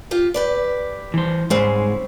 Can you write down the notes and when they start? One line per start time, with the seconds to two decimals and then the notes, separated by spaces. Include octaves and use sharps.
0.11 F4 G4
0.34 G4 B4 D5
1.14 E3 C5
1.50 G#2 C#3 G3 G#3 C4